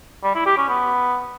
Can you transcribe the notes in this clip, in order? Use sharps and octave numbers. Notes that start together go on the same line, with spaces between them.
G3
E4
G4
C#4
B3